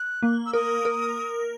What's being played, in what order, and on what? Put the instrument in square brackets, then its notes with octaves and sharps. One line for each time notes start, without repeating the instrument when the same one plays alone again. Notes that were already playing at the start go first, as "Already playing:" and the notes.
Already playing: [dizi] F#6
[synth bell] A#3
[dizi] E6
[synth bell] A#4 [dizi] D#6
[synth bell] A#4